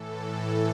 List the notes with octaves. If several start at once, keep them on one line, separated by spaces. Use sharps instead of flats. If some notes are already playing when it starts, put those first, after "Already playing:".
Already playing: A2 E3 A4
A4